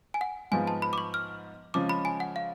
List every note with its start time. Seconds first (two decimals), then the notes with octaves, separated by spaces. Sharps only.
0.14 G#5
0.21 F#5
0.52 G#2 F3 B3 F4 G#5
0.67 A5
0.82 B5
0.93 D6
0.98 C#6
1.14 F6
1.74 C#3 F3 G#3 C#4 F4 D6
1.89 B5
2.05 G#5
2.20 F#5
2.36 F5